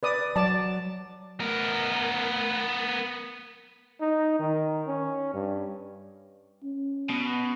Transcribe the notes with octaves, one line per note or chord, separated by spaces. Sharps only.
B4 D5 D#6
F#3 D5 A5
B3 A#4
D#4
D#3
C#4
G2
C#4
B2